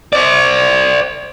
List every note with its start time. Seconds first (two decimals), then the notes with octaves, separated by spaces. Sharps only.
0.13 C5 D5